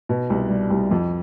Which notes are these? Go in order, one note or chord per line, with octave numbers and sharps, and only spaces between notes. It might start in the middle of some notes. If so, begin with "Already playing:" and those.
B2
C2
G3
C2
F2